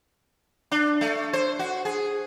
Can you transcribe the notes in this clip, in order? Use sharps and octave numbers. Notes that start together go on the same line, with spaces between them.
D4
A3
C5
F#4
G#4